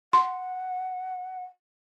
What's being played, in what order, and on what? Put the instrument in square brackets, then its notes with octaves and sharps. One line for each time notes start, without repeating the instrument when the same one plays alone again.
[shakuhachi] F#5 [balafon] C6